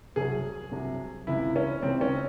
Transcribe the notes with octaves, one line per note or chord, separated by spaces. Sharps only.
C2 C3 F#3 G#4
C2 C3 F#3
C#2 C3 E3 E4
C#4
C#2 C3 E3 C4
C#4